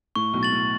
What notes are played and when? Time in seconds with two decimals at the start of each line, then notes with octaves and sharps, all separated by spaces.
0.16 A2 C#6
0.34 B1 B2
0.43 A6 F#7
0.52 A2